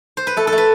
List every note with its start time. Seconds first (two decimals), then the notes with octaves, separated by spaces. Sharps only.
0.17 C5
0.27 B4
0.37 A3 A4
0.47 A4
0.52 A3
0.58 B4